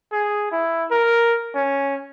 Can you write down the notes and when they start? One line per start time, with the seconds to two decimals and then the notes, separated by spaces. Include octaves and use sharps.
0.12 G#4
0.51 E4
0.91 A#4
1.55 C#4